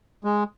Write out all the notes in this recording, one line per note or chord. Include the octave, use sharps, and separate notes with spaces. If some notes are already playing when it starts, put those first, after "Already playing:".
G#3